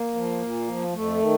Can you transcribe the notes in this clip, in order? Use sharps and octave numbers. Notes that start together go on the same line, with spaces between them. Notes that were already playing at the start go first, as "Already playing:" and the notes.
Already playing: A#3
F3
A#2
F3
F2 A3
D#3